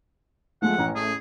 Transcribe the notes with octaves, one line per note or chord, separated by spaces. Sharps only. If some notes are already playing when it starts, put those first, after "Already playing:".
F3 G#3 A3 F#5
A1 E3 C#4 A#5
A3 G#4